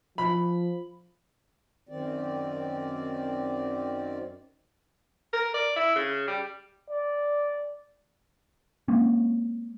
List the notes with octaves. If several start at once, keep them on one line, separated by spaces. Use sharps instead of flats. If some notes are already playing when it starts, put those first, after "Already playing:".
F3 B5
F#2 D#3 C4 D5
A#4
D5
E4
C#3
G3
D5
G#3 A#3 C4 C#4